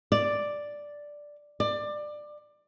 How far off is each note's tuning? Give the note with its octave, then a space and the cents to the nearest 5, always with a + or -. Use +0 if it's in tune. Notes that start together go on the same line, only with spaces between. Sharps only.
D5 +0
D5 +20